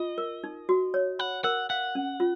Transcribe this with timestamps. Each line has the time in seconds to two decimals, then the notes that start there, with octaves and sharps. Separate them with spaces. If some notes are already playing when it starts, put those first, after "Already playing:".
Already playing: F4 D#5
0.18 A#4
0.44 D#4
0.69 F#4
0.94 C#5
1.19 F#5 B5
1.44 A#4 F#5
1.70 F5 F#5
1.95 C#4
2.20 F4